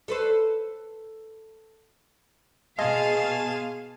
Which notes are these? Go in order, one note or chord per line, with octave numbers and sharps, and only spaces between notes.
A4 B4 C5
B2 G#4 D#5 F5 G#5 A5 C6